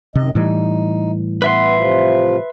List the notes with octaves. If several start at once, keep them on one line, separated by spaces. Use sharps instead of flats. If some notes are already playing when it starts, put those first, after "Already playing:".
F#2 C3 D#3 D#5
A2 E3 G3 D#4
B3 B4 E5 C6
C3 F3 F4